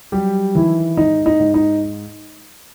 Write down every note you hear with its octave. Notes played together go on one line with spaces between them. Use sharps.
F#3 G3 G4
D#3 E3 E4
G#2 D#4
D#4
G#2
D#4